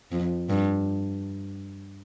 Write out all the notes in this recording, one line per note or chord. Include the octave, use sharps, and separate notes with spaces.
F2
G2